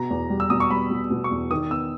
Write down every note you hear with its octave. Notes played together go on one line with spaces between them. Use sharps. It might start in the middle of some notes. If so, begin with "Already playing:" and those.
Already playing: B2 A#5
E2
G3
E6
B2 D#6
C#6
G3 B5
B2
B2
C#6
E2
D#3 D#6
B3 E6